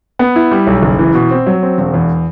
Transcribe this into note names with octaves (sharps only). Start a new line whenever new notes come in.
B3
E4
G3
B1
F#1
E3
B2
C4
F#3
C4
E1
E2